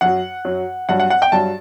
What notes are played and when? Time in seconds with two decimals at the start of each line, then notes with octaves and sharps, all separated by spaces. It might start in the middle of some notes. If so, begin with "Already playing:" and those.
0.01 F#2 F#3 F#5
0.45 F#2 F#3
0.89 G2 F#3 F#5
1.00 F#5
1.10 F#5
1.22 G5
1.32 G2 F#3 A5